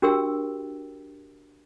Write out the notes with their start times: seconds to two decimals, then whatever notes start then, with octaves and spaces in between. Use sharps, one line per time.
0.02 D4 F#4 G4 A#4 G5 E6